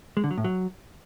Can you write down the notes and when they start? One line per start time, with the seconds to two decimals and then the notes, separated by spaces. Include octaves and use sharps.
0.17 G#3
0.24 D3
0.31 F#3
0.38 A2
0.44 F#3